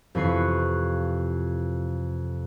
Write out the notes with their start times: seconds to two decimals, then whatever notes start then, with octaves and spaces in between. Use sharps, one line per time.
0.15 F2 C3 E3 B4 C#6 C7